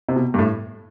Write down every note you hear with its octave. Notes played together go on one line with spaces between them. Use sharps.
C3
B2
G2
A2